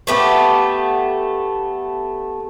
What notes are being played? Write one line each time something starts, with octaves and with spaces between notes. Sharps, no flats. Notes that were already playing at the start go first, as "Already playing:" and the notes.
A3 B3 G4